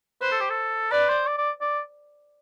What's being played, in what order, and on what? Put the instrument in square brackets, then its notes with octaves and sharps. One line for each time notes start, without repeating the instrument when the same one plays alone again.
[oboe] B4 [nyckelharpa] C5
[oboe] A4
G4
A4
[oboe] B4 [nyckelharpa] D5
[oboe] C5
D5
D5
D5